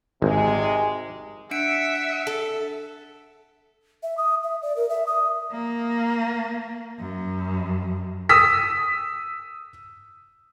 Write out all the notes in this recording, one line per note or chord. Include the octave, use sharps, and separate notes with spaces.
G#1 C3 G#3
D4 E5 F#5 C#7 D7
A4
E5
D#6
E5
D5
A#4
E5
D#6
A#3
F#2
D#6 E6 B6